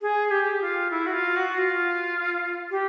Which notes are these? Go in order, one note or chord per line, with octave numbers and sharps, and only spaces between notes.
G#4
G4
F4
E4
F#4
F4
F#4
F4
G4